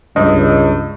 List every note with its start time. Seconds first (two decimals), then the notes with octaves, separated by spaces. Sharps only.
0.16 C#2 G2 D#5